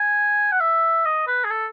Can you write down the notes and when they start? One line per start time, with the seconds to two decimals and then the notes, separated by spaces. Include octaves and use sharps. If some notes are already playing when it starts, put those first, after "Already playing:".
Already playing: G#5
0.52 F#5
0.60 E5
1.05 D#5
1.28 B4
1.44 G#4
1.51 A4